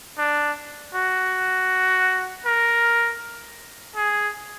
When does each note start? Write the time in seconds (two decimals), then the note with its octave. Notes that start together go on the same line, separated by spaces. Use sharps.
0.18 D4
0.94 F#4
2.45 A#4
3.96 G#4